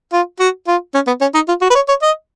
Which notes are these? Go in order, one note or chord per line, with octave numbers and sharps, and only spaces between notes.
F4
F#4
F4
C#4
B3
C#4
D#4
F4
F#4
B4
C#5
C#5
D#5